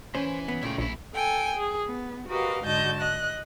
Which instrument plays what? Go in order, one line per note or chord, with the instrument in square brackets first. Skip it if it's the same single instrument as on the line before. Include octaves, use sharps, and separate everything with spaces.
[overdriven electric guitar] E3 G#5 [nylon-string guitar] C#4 [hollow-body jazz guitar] C5
[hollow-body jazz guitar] B3
[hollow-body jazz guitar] A#2 C#3 A3 [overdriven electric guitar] E4 G5
[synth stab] A#1 [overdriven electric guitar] F#2 E4
[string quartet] A4 G5 G#5
G#4
B3
F#4 G4 A#4 B4 D#5 F5
G#2 D3 F#4 D#5 A5 G6
D#5 F#6